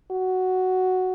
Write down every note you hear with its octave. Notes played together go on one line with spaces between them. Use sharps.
F#4